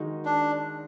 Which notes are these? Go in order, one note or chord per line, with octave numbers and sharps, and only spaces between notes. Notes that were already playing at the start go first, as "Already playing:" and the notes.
Already playing: D#3 G#3 D#4 F#4
D4